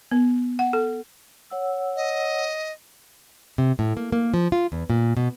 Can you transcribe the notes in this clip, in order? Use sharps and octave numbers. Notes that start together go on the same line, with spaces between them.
B3
F#5
A4
C#5 F#5 E6
D#5
C3
A2
A#3
A#3
F3
F4
E2
A#2
B2